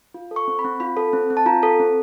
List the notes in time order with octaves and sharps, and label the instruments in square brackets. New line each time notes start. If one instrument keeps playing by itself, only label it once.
[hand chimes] F4
A4
C#6
C4
B5
C4
F4 B5
A4
C4
C4
A5
F4 A#5
A4
C4